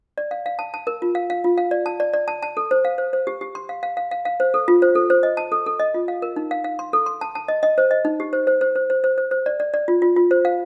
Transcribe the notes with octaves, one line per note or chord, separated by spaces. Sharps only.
D5
F5
F5
A5
A5
A#4
F4
F5
F5
F4
F5
D5
A5
D5
D5
A5
A5
A4
C5
F5
C5
C5
G4
G4
C6
F5
F5
F5
F5
F5
C5
A4
F4
C5
A4
C5
D#5
A5
A4
A4
D#5
F4
F5
A#4
D#4
F5
F5
C6
A4
C6
A5
A5
D#5
D#5
C5
D#5
D#4
G4
C5
C5
C5
C5
C5
C5
C5
C5
D5
D5
D5
F4
F4
F4
C5
F5